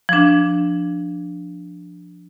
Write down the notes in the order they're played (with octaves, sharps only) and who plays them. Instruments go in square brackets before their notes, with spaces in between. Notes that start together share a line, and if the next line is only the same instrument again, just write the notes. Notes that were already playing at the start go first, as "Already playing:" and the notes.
[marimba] F3 D4